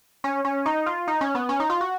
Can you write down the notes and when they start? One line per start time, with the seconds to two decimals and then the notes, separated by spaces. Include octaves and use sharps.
0.24 C#4
0.45 C#4
0.66 D#4
0.86 F4
1.08 D#4
1.21 C#4
1.35 B3
1.49 C#4
1.60 D#4
1.70 F4
1.81 F#4